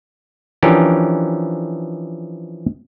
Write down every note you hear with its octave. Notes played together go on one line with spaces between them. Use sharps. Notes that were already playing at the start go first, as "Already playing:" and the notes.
E3 F3 C#4 D4 G4 A#4